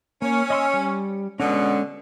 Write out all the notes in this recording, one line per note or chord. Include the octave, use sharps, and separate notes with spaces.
A#3 C#4
D#5 C6 E6
G3
B2 D3 G#3 C#4